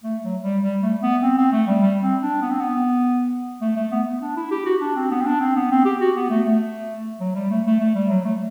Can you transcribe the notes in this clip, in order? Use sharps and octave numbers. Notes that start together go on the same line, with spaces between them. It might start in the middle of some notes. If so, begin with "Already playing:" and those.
A3
F#3
G3
G3
A3
B3
C4
C4
A3
G3
G3
C4
D4
B3
C4
B3
A3
A3
B3
D4
E4
G4
F#4
D4
C4
B3
C4
D4
C4
B3
C4
G4
F#4
B3
A3
A3
F#3
G3
A3
A3
A3
G3
F#3
A3